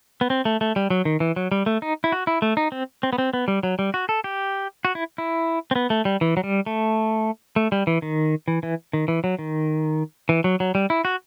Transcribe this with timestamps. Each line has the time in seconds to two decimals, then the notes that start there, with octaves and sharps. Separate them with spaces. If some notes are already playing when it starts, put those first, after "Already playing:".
0.21 B3
0.30 C4
0.45 A3
0.61 A3
0.76 G3
0.90 F#3
1.05 D#3
1.20 E3
1.36 F#3
1.52 G3
1.66 A3
1.82 D#4
2.04 E4
2.12 F#4
2.27 E4
2.42 A3
2.57 D#4
2.72 C4
3.03 C4
3.13 B3
3.18 C4
3.34 B3
3.48 G3
3.63 F#3
3.79 G3
3.94 F#4
4.09 A4
4.24 G4
4.85 F#4
4.95 E4
5.18 E4
5.71 C4
5.76 B3
5.90 A3
6.05 G3
6.21 E3
6.37 F#3
6.44 G3
6.66 A3
7.56 A3
7.72 G3
7.87 E3
8.02 D#3
8.48 E3
8.63 E3
8.93 D#3
9.08 E3
9.24 F#3
9.39 D#3
10.29 E3
10.44 F#3
10.60 F#3
10.75 G3
10.90 E4
11.05 F#4